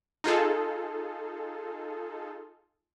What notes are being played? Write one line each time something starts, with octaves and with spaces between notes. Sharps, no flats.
D#4 F4 G#4 A4